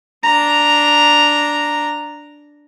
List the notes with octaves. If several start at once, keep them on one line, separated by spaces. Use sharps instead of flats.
D4 A#5